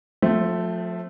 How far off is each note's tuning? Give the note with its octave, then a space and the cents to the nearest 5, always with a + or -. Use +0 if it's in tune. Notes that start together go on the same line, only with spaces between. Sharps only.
F3 +35 A3 +0 C4 -5